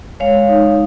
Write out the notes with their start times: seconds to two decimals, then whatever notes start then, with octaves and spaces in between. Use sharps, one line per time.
0.20 G#3 C#5 F5
0.49 D#4